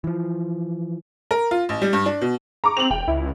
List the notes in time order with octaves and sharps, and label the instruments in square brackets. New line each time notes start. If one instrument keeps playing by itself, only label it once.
[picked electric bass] E3 F3
[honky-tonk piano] A#4
F4
A1
G3
G2
D4
B2
A#5 C#6 D6
[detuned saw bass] C4 [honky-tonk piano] F7 F#7
[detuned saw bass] E1 [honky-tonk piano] G5
[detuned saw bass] C#2 [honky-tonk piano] E4